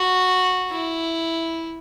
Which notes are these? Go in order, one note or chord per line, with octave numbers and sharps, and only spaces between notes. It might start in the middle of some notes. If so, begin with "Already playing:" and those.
Already playing: F#4
E4